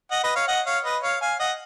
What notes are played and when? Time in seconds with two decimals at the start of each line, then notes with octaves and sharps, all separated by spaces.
0.11 D#5 F#5
0.23 B4 D#5
0.35 C#5 F5
0.48 D#5 F#5
0.66 C#5 F5
0.84 B4 D#5
1.03 C#5 F5
1.21 F5 G#5
1.39 D#5 F#5